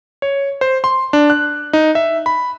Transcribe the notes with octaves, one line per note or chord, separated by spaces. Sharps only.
C#5
C5
C6
D4
F#6
D#4
E5
B5